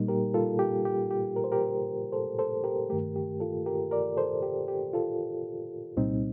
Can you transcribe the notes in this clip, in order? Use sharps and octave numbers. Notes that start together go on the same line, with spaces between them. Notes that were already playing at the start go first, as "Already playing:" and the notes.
Already playing: A#2 G3 A#3 D#4
G4 A#4
F4 A4
G4
G4
G4
A#4
C5
G4 A#4
A4 C5
A4 C5
G4 A#4
G2 D#3 A3 G4 A#4
G4
F4 A4
G4 A#4
A#4 D5
A4 C5
G4
G4
F4 A4
C2 A#2 G3 C4 D#4